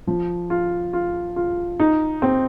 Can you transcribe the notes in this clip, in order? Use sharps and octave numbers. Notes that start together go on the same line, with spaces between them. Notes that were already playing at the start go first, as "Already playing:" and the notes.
F3
F4
F4
F4
D#4
C4